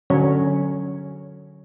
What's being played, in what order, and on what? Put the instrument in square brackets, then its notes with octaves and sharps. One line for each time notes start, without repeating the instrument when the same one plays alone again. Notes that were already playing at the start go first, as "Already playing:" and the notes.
[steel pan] D3 F#3 C#4 C#5